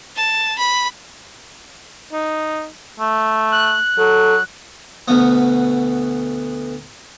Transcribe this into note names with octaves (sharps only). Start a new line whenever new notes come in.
A5
B5
D#4
A3
F#6
F#3 A4
D2 B2 B3